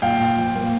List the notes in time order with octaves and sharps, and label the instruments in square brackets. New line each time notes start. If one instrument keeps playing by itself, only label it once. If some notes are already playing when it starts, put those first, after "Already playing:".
[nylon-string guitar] A#2 [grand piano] F5 G5
[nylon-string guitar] A#2
F3
A#3